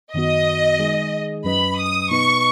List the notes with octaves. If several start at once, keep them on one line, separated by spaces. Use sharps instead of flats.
F#2 D#3 B3 F#4 D#5
D#3 G#3 D#4 G#4
F#2 F#3 C#4 B4 D#5 B5
D#6
B2 B3 D#4 B4 D#5 C#6